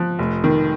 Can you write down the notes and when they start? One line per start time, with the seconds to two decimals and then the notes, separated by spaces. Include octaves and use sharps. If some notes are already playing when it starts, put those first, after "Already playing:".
Already playing: F3 F#6
0.19 F1
0.44 D#3